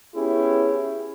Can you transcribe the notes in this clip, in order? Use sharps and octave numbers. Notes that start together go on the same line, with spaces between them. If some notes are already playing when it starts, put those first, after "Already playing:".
B3 C#4 E4 G4 G#4